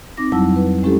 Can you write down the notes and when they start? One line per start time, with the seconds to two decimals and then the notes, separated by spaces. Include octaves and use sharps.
0.17 C4 D#4 D6 A#6
0.32 F2 F#3 G3 E4 A5 E6
0.56 B4
0.83 G#3 C#4 E4 G4 A4